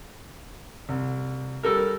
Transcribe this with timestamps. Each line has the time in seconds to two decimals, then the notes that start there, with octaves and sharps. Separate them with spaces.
0.89 C2
1.63 G3 A4 A#4